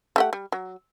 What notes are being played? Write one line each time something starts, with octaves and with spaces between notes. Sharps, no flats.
A3 G4 F#5
G3
F#3